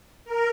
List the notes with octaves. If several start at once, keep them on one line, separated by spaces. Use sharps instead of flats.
A#4